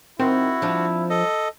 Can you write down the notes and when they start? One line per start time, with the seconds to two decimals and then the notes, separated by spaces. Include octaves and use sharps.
0.20 D#3 C4 E4 F#4
0.62 F3 D4
1.10 A4 D#5